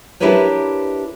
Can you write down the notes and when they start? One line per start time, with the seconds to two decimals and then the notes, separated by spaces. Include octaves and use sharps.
0.20 D4 E4 G4 A#4 B4 C#5